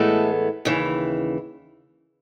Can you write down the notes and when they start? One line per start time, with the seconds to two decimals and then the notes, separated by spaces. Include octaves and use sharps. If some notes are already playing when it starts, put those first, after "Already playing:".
Already playing: A2 E3 G#3 A3 B3 A4
0.65 D#2 C#3 E3